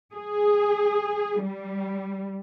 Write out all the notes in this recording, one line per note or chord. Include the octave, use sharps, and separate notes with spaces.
G#4
G3